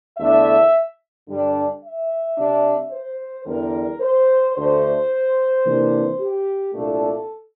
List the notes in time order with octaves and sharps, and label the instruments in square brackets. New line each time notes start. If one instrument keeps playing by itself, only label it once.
[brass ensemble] E2 D3 A3 D4 E5
G2 D3 G3 D4
E5
C3 G3 D4
C5
E2 D3 G3 A#4
C5
D2 D3 A3 C5
C3 E3 A#3 D4
G4
C2 A#2 A3 D4 A4